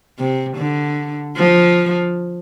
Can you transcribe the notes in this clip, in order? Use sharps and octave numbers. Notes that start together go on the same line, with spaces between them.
C3
D3
F3